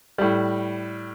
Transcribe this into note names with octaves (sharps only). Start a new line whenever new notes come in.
A2 G3